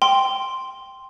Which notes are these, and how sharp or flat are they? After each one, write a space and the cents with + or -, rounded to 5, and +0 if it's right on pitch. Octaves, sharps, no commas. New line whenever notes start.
G5 +0 C6 +0